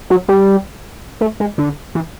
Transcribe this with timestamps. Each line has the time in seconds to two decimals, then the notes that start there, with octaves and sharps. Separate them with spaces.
0.10 F#3
0.28 G3
1.21 A3
1.40 G#3
1.58 D3
1.95 E3